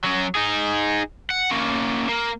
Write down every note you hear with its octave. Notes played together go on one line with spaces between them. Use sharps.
F#3 C#4
D#4 G#4
F#5
A#3 C#4
A#3